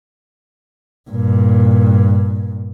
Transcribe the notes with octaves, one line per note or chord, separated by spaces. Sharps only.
G2 A#2